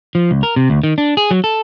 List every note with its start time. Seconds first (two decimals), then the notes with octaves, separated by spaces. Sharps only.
0.15 F3
0.31 C#2
0.43 A#4
0.56 C3
0.70 D2
0.83 D#3
0.98 D4
1.17 G#4
1.31 F#3
1.44 A4